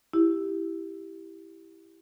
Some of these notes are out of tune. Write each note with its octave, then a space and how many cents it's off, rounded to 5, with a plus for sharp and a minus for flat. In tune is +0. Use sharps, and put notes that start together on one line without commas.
E4 +0 G4 +0